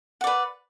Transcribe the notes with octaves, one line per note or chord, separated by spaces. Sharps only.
B4 D5 F#5